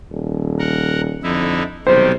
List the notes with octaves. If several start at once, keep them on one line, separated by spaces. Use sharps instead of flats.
D#1
A#4 F#5
F2 D3 D#4 E4
B1 C3 D#3 G3 C5